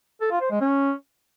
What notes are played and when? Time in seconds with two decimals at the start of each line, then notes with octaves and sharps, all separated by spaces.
0.21 A4
0.31 F4
0.41 C5
0.51 G#3
0.61 C#4